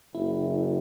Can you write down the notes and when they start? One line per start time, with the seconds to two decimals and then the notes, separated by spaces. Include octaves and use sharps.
0.15 F#1 E4